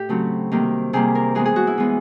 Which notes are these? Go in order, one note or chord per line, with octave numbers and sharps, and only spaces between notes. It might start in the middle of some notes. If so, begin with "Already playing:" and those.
Already playing: A2 G4
C#3 F#3 A3 C4
C3 D#3 G3 A#3
C3 D#3 G3 A#3 G#4
A#4
E3 G#3 B3 G#4
G#4
F#4
E4
E3 G#3 B3